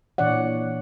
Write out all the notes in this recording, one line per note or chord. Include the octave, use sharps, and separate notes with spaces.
A#2 E3 D4 C#5 D5 F#5